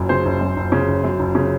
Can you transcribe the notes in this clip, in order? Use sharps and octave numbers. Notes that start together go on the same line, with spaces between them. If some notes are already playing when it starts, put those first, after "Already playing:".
Already playing: F#1 F#2
C#3 C5
F#1
F#2
F#1
C#3
F#1
F#2
F#1
C#3